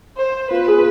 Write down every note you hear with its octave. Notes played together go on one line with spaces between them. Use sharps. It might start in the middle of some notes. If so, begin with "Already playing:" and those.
C5
F4 B4
G#4